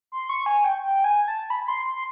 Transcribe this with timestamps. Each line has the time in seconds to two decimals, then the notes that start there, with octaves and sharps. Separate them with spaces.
0.12 C6
0.29 C#6
0.46 G#5
0.64 G5
0.82 G5
1.04 G#5
1.28 A5
1.50 B5
1.64 B5
1.68 C6
1.86 C6